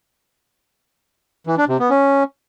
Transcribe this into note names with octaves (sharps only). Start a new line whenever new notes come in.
E3
D4
C3
B3
C#4